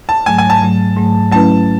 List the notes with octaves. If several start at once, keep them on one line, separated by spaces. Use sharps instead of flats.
A5
G#2 F#3 A3 G#5
G#5
A5
G#2 F#3 A3
G#2 F#3 A3
F#3 A3 C#4 E4 B4 A5